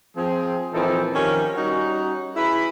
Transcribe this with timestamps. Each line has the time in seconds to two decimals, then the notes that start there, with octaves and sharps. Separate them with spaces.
0.16 F3 C4 G#4
0.73 A#2 E3 F3 C4 D#4 A4
1.14 D#3 F3 C#4 G4 A#4
1.56 G3 C#4 D#4 F#4
2.35 E4 G#4 B4 B5